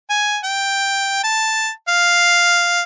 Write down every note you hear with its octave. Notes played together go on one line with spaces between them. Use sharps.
G#5
G5
A5
F5